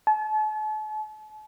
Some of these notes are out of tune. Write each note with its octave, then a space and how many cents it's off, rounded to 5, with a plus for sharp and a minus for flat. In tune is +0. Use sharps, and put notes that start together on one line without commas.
A5 -40